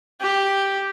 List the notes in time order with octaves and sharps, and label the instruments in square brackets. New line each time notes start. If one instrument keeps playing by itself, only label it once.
[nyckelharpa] G4